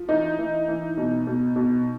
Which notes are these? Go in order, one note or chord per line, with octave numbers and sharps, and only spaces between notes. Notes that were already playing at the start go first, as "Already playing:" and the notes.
Already playing: F3
E3 D#4
E3
E3
B2
B2
B2